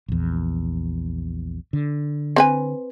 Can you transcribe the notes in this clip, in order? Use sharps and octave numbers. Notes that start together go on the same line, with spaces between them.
A#1 E2
D3
C4 B4 G#5